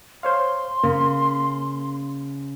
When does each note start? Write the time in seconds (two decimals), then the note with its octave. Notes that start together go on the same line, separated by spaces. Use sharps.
0.23 C5 C#5 F5 C6
0.84 C#3 A#3